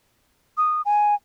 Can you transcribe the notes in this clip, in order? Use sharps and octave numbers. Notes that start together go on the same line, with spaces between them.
D#6
G#5